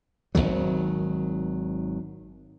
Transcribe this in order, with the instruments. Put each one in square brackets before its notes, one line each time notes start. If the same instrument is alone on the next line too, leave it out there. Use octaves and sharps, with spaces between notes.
[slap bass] G#1 D#2 D#3 F#3